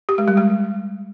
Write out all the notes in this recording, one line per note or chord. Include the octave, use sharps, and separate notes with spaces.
G4
G#3
G3
G#3